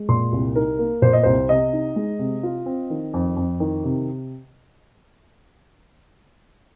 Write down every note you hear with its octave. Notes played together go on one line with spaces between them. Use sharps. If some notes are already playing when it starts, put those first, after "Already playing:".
Already playing: G#3
A#2 C6
C2
D#4 A#4
A#3
A#2 C5
D#5
C2 C5
C3 D#5
D#4
G#3
C3
F4
C4
D#3
F2
F2
D#3
C3